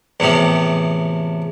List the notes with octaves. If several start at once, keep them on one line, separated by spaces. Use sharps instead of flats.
E2 A2 C3 F3